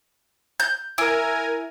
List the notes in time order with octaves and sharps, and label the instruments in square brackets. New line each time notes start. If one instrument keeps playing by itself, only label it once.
[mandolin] G6
[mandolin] E4 [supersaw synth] A#4 G#5